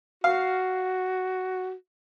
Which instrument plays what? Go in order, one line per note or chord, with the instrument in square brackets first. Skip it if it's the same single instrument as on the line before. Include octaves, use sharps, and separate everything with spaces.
[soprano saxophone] F#4 [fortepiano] F5